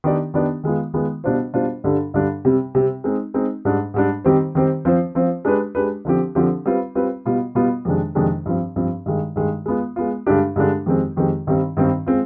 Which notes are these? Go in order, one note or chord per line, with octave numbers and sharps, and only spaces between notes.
D#3 B3 D4 G4 D5
D#3 B3 D4 G4 D5
D#3 G#3 B3 F4
D#3 G#3 B3 F4
B2 G3 D4 F4 C5
B2 G3 D4 F4 C5
G2 D3 G3 D4
G2 D3 G3 D4
C3 G3 C4
C3 G3 C4
G#3 C4 D#4
G#3 C4 D#4
G#2 G3 D4
G#2 G3 D4
D#3 G3 C4 G4 C5
D#3 G3 C4 G4 C5
F3 C4 F4 C5
F3 C4 F4 C5
G#3 D4 G4 B4
G#3 D4 G4 B4
D3 F3 C4 G4
D3 F3 C4 G4
G3 C4 F4 B4
G3 C4 F4 B4
B2 G3 B3 F4
B2 G3 B3 F4
F2 C3 D#3 G#3 D4
F2 C3 D#3 G#3 D4
G2 F3 C4
G2 F3 C4
G2 D#3 G#3
G2 D#3 G#3
G#3 B3 F4
G#3 B3 F4
G2 D3 G#3 D4 G4
G2 D3 G#3 D4 G4
F2 D#3 G#3 C4 G4
F2 D#3 G#3 C4 G4
G2 D#3 G3 C4
G2 D#3 G3 C4
G#3 C4 F4